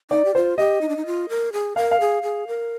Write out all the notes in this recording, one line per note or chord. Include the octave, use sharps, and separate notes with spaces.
D#4 D5
G4
F4 C5
G4 D#5
D#4
D4
D#4
F4
A#4
G#4
A#4 F5
F5
G#4
G#4
A#4